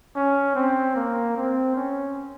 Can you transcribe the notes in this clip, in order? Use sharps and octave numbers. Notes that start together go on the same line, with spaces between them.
C#4
C4
A#3
C4
C#4